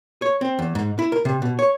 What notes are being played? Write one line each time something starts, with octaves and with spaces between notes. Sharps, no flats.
C#5
C4
E2
G#2
E4
A#4
C3
B2
C#5